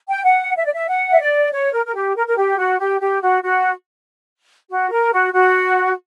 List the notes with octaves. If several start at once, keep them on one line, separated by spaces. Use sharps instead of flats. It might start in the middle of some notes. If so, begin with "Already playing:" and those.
G5
F#5
E5
D5
E5
F#5
E5
D5
C#5
A#4
A#4
G4
A#4
A#4
G4
F#4
G4
G4
F#4
F#4
F#4
A#4
F#4
F#4